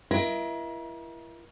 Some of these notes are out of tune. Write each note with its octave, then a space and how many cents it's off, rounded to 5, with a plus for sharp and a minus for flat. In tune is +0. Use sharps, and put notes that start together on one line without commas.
E4 +35 A#4 +40 D#5 +30